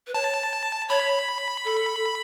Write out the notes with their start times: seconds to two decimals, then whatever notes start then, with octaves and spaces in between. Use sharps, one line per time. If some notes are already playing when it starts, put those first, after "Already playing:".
0.07 B4
0.14 C#5 A5
0.89 C#5 B5
1.65 A4